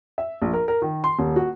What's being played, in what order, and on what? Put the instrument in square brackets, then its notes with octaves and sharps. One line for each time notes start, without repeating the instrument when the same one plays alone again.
[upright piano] E5
A#1
A#4
A#4
D#3
C6
D#1
F#4